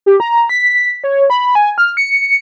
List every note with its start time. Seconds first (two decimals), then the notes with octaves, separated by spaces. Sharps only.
0.06 G4
0.20 A#5
0.49 B6
1.04 C#5
1.30 B5
1.55 G#5
1.78 F6
1.97 C#7